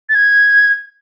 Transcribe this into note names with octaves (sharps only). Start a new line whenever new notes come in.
A6
G#6